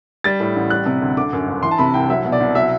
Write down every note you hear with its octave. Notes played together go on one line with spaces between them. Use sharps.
G3 A6
A2
A1
G3 F#6
C3
D2
D3 D6
F#2
G1
E3 C6
A5
C3 B5
C2 G5
F#3 E5
B2
D5
C2
F#3 E5